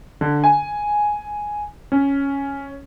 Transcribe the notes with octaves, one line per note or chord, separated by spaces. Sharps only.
D3
G#5
C#4